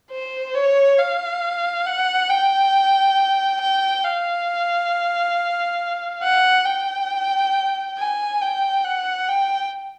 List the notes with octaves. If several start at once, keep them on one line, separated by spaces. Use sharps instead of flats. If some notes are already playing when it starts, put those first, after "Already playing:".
C5
C#5
F5
F#5
G5
G5
F5
F#5
G5
G#5
G5
F#5
G5